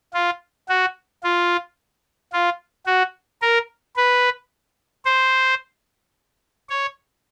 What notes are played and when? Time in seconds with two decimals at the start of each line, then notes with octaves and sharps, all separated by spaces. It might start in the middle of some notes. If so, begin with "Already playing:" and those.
0.14 F4
0.69 F#4
1.24 F4
2.33 F4
2.87 F#4
3.42 A#4
3.96 B4
5.05 C5
6.70 C#5